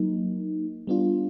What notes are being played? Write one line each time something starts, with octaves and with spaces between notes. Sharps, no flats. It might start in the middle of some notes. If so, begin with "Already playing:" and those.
Already playing: F#3 A#3 D#4
G3 B3 D4 F4